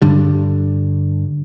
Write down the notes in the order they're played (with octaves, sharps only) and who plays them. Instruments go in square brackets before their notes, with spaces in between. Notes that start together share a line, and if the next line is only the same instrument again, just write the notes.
[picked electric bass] G2 D3 G3